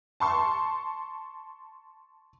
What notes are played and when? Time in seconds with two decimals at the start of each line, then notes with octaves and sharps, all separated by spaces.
0.20 A5 C6 C#6